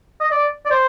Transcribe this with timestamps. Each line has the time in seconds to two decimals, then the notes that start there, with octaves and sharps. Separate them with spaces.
0.20 D#5
0.31 D5
0.65 D5
0.71 C5